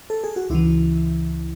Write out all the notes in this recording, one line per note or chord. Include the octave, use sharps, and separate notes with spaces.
A4
G#4
F#4
C#2 C#3 E3 E4